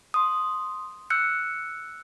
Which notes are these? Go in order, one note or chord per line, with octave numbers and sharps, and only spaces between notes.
C6 D#6
E6 F#6 G6 C#7